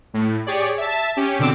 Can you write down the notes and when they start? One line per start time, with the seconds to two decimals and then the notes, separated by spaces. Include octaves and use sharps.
0.14 A2
0.46 G4 G#4 C#5 D5
0.78 E5 A5
1.17 C#4 G4
1.39 B2 D3 C4 D6 E6